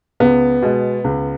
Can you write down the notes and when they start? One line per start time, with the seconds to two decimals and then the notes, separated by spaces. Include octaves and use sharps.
0.20 C#2 B3
0.62 B2 G#3
1.04 C#2